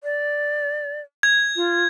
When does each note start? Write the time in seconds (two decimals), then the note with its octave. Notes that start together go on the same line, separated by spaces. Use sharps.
0.04 D5
1.23 G#6
1.56 F4